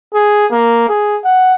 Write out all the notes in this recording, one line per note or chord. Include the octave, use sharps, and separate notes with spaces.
G#4
A#3
G#4
F#5